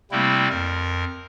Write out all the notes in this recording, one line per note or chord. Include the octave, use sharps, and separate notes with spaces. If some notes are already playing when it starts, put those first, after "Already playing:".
C3 G3 A3 A#3 C4 E4
F2 A#4